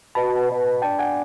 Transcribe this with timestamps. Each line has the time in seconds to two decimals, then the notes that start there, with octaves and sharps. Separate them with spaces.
0.15 B2 A5 B5
0.49 B2
0.82 D4 G5 A5
0.99 F#5 G#5